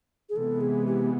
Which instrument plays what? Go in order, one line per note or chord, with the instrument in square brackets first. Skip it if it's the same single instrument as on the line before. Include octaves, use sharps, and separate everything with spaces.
[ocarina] G#4
[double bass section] C3 E3 G#3 B3 [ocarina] A4
[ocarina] G#4
G4